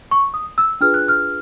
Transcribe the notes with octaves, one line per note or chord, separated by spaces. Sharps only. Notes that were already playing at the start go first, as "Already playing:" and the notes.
C#6
D#6
E6
D4 F4 G#4 B4 F6
F#6
F6